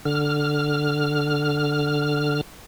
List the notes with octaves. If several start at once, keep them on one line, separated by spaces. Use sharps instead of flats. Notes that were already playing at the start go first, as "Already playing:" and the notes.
D3 F6